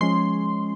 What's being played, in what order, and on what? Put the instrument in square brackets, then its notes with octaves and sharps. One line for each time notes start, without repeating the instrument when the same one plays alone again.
[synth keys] F3 G#3 C#4 C6